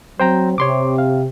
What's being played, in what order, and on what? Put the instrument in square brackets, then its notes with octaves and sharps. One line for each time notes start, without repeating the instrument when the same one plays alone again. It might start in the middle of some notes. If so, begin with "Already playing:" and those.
[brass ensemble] F#3 C4 [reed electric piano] C5 G5 A#5
[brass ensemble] C3 [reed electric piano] C#5 C6 D6
[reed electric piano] F5